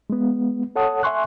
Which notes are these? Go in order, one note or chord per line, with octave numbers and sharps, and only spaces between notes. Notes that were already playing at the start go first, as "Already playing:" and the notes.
G#3 B3
A4 C#5 F#5 A5 D#6
E5 G#5 C6 C#6 F#6